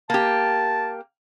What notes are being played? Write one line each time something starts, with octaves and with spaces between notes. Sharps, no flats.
A#3 G4 A5